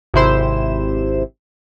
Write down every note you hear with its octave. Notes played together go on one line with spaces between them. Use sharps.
G#1 C3 E4 C5 E7